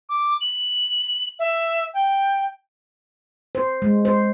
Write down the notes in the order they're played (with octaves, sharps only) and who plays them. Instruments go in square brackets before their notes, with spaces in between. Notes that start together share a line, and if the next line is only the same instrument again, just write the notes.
[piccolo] D6
F#7
E5
G5
[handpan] C5
G#3
C5